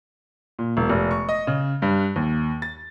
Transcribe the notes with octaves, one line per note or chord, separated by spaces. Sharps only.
A#2
E1
F1
C#6
D#5
C#3
G2
D#2
A6